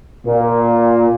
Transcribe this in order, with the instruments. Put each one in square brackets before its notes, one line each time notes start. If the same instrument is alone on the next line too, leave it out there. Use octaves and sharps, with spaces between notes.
[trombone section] A#2